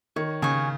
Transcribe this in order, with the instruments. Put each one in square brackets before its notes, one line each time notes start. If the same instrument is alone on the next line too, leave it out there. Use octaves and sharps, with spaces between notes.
[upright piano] D#3 [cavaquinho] C#5
[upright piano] C#3 [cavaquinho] G#5 C#6